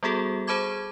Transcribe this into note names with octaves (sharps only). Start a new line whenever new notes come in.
G3 B3 F#4 G#4 A4
G#4 C5 A5 B5 D6 G#6